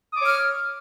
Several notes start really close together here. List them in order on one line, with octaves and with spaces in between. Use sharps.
D#6 D6 C#5 F6